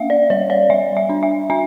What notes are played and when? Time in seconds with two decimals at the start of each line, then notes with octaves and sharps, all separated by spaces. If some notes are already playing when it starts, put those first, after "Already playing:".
Already playing: A#3 C#4 E5 F5
0.10 D5
0.30 G3 C#5
0.50 D5
0.70 G3 E5
0.97 E5
1.09 D4
1.23 E5
1.50 D4 E5